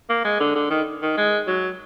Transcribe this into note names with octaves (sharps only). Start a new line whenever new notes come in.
A#3
G#3
D3
D3
D#3
D#3
G#3
F#3